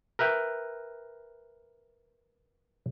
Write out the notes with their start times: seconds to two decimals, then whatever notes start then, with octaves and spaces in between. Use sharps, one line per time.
0.19 A#4 B4 E5 G5